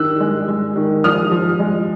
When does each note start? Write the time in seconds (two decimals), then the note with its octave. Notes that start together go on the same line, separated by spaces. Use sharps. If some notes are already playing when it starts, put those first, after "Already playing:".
Already playing: D#3 D4 E6 F#6
0.20 G#3
0.48 G#3
0.76 D#3
1.04 F3 D#6 F6
1.31 F3
1.60 G#3